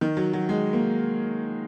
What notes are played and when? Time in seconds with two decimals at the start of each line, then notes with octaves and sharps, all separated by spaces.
0.01 D#3
0.17 F#3
0.33 F#3
0.49 G#3
0.73 A#3